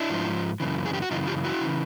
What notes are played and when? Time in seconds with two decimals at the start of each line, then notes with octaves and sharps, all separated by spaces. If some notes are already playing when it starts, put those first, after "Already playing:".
Already playing: D4 E4
0.10 G#2 F3
0.60 F#2 C#3 E3
0.86 G#4
0.93 G4
1.02 F#4
1.11 F#2 C#3 E3 D#4 F4
1.27 F4 G4
1.44 E4 F#4
1.61 C#3 E3